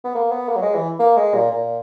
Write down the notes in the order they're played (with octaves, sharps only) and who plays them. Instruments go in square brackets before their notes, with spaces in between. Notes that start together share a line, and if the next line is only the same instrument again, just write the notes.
[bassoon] B3
A#3
B3
A#3
F#3
G#3
E3
A#3
G#3
A#2
A#2